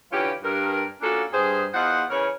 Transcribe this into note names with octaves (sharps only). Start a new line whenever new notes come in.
D3 E3 C#4 F4 G4
G2 A#4
A#3 C#4 D4 F4 F#4 A4
G2 G#4 C5
E2 F4 C5 D#5 F#5
C#3 E3 A#4 C#5